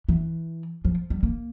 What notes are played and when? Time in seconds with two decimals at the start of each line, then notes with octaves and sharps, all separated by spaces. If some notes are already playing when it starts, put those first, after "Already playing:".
0.09 E3
0.85 F3
1.10 G3
1.23 A#3